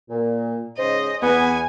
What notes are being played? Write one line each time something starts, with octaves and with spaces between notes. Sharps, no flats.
A#2
G#2 C#3 C5 D#5
E2 B3 G#5